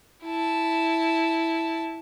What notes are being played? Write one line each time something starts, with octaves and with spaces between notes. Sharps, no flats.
E4 A5